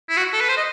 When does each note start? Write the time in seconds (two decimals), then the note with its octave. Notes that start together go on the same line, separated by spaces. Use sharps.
0.09 E4
0.17 F#4
0.33 A4
0.41 B4
0.49 C5
0.57 D#5